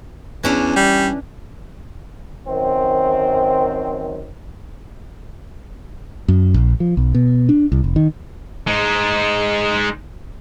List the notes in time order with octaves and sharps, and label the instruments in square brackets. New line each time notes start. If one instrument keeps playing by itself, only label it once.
[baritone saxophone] E2 [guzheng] E3 C#4 D4
[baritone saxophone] G3
[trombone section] F#2 D#3 C4
[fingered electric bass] F#2
A#1
F3
B1
B2
D4
C2
F1
D#3
[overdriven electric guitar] G#3 D#4